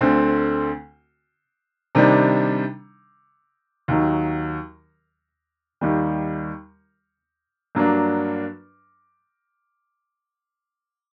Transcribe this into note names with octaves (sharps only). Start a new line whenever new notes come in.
D2 D3 A3 C4
C3 D#3 G3 D4
D#2 D#3 F#3
D#2 D#3 G3
G2 F#3 A#3 D4